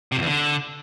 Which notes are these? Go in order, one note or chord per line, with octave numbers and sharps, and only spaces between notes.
C3
F2
E2
D3